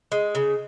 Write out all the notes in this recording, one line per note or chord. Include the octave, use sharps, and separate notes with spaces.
G#3
C#3